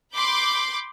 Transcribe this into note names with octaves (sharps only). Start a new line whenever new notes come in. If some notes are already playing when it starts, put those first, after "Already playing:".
B5 C6 D6 G6